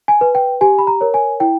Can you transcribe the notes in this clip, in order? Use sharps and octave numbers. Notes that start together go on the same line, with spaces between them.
G#5
B4
G5
G4 G#5
B5
A#5
A#4 C#5
G#5
E4 G5